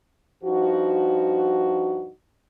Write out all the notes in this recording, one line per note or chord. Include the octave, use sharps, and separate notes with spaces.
G2 F3 D#4 F#4